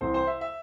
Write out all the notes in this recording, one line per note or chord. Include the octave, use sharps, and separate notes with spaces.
C2 C3 E3 C4 C5
C5
E5
E5